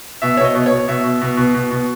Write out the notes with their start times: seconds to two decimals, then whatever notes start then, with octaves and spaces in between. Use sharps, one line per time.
0.22 B2 E5
0.37 B2 C#5
0.44 D#5
0.55 B2
0.66 C#5
0.71 B2
0.88 B2 E5
1.04 B2
1.21 B2
1.37 B2
1.55 B2
1.71 B2